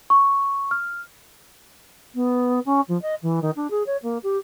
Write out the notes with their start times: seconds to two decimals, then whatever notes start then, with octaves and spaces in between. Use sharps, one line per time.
0.10 C#6
0.71 F6
2.14 B3
2.65 C#4
2.88 F3
3.02 D#5
3.22 E3
3.42 D#3
3.56 D4
3.70 G#4
3.86 C#5
4.02 A#3
4.23 G4